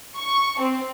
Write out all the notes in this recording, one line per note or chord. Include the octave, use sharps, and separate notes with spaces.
C#6
C4